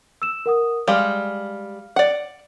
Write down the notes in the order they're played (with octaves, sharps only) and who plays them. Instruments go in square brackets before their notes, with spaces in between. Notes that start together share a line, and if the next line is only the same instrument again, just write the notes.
[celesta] E6 E7
A#4 F#5 D#6
[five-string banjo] G3 G#3 [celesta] F5 F6
[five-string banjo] D5 F#5